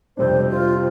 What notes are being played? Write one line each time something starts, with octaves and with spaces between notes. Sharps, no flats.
F2 C3 G3 D4 C5
F4